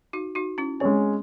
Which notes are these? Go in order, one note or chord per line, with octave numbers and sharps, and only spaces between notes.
D#4 F#4
D#4 F#4
C#4 E4
G#3 C4 C#4 G#4 C#5